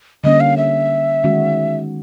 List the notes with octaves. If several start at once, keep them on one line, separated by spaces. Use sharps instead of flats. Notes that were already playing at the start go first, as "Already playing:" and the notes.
D3 G3 A#3 C#4 D#5
F5
E5
D#3 G#3 C#4 F#4